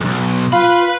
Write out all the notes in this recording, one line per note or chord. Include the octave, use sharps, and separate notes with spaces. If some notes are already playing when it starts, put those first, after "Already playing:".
B1 F2
F4 B4 B5